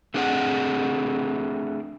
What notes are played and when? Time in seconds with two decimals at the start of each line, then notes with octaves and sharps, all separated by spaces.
0.14 A3 C4 D4 G#4 F5 F#5